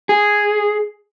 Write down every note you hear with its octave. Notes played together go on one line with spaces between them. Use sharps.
G#4